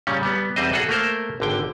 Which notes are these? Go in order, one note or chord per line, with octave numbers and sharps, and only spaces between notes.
A#2 C#3 G3 C#4
G3 B3
E2 G3 C4 C5 D#5
F#4 G#4 A4 F#5
A3 A#3 A#4 C5
G#1 D3 G5